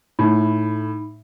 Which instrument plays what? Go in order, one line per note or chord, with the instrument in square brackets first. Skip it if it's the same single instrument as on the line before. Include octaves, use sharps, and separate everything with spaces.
[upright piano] A2 [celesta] D#4 B5